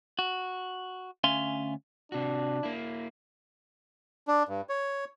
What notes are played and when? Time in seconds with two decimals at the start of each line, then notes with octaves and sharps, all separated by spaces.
0.19 F#4
1.24 D2 C#4 E5 F5 G#5 C6
2.12 C3 D4 F#4
2.63 A#3 E4
4.28 D4
4.49 G2
4.69 C#5